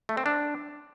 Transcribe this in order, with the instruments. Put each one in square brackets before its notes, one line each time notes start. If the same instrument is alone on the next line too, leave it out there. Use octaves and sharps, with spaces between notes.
[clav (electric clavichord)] A3
C4
D4